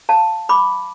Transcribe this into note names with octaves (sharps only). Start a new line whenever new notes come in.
F5 A5
B5 D6